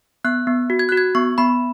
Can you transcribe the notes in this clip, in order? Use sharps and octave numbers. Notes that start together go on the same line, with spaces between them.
B3 F#6
B3
F#4
G#6
F#4 F#6
G#6
B3 C#6
B3 B5